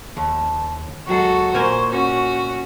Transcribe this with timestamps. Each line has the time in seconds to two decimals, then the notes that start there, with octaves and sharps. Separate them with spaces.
0.17 D#2 A5
1.07 D#2 F#3 G#3 F#4 A4 C#6
1.54 A#2 A#4 C5 G#5
1.90 C#4 F#4